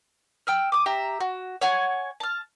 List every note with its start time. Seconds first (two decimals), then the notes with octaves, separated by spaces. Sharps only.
0.47 G5 E6 F6
0.72 D6 D#6
0.86 G4 E5 A#5
1.20 F#4
1.61 C#5 F#5 G#5
2.20 A5 F6